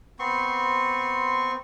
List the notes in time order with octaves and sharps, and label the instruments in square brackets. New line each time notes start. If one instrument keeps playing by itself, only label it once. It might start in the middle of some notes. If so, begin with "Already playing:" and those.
[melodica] B3 C4 C6 C#6